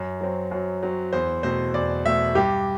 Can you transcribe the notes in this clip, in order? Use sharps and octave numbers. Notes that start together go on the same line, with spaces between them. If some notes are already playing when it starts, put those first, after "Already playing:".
Already playing: F#2
F#3 C4
F#2
F#3 C4
E2 C5
B2 A3 C4 C5
E2 D5
B2 A3 C4 E5
G2 G4